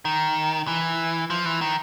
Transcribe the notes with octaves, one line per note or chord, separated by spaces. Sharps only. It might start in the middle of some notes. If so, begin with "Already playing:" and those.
D#3
E3
F3
E3
D#3